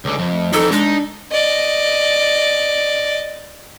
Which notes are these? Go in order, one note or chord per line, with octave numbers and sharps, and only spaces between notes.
C#2 D3
F2
A3
F2 E3 D#4 A4
G#3 D4 D#4
D5 D#5